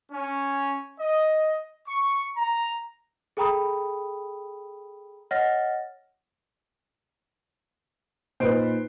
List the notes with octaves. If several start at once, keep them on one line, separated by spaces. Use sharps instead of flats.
C#4
D#5
C#6
A#5
G#4 A4 G5 A#5 B5 D#6
C#5 D#5 F#5 F6 A6 A#6
A#2 D#4 B4 C5 D7